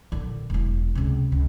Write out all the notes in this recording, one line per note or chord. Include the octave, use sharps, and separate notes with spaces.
A#1 D3
E1 E4
C#2 C3
C#2